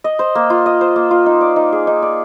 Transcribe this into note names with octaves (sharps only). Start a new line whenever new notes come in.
D#5
C5
A#3
F4
D#5
C5
A#3
F4
D#4
D5
D#4
G#4
D#4
D5